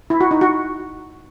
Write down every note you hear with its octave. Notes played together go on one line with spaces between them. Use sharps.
E4
F#4
D#4
F#4